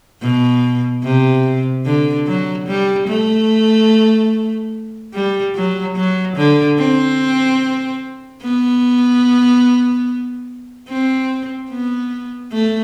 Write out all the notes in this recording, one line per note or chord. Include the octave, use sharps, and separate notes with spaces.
B2
C3
D3
F#3
G3
A3
G3
F#3
F#3
D3
C4
B3
C4
B3
A3